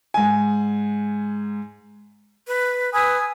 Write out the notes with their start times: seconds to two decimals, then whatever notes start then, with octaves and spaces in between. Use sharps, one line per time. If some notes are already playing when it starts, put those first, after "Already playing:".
0.14 G#2 G#5
2.47 B4
2.93 B4 G#5 D#6 E6